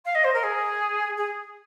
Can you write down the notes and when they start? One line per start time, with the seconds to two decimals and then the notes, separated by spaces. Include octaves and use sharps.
0.05 F5
0.15 D#5
0.24 C5
0.33 A#4
0.43 G#4
1.17 G#4